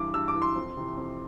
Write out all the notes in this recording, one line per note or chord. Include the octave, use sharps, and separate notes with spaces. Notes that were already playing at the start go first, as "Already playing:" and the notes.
Already playing: G2 E3 D6
G2 E6
D6
E3
C6
F2
C3 E3
F2